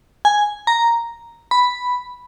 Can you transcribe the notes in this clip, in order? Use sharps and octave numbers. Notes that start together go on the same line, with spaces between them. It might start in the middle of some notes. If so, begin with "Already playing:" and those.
G#5
A#5
B5